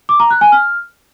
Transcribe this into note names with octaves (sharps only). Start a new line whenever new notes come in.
D6
A#5
F#6
G#5
F6